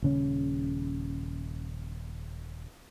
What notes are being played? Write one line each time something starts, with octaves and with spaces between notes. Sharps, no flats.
D#1 C#3 C#4